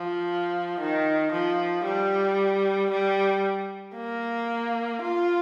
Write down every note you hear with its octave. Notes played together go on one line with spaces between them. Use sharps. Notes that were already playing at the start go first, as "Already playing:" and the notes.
Already playing: F3
D#3
F3
G3
G3
A#3
F4